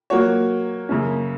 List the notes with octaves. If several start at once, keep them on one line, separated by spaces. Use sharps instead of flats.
F#3 A#3 F#4 C#5
F#2 C#3 A#3 C#4